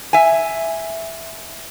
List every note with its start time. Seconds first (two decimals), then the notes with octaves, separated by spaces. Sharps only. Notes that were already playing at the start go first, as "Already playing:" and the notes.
0.13 E5 G#5